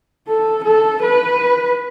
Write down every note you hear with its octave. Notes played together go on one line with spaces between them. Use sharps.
A4
A4
B4